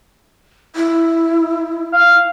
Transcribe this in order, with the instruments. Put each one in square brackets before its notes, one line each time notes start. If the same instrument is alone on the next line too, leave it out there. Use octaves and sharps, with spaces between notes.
[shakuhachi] E4
[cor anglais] F5